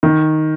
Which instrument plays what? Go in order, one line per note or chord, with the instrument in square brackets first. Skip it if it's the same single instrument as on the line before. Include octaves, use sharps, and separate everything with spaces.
[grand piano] D#3